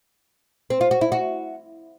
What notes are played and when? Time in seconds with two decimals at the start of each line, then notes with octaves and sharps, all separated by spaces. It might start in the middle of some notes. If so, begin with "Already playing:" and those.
0.70 C4
0.81 F4
0.91 F#4
1.01 E4
1.12 F#4